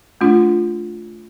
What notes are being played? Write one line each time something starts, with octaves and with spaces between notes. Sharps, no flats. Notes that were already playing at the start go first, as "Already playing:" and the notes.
A3 D4 F4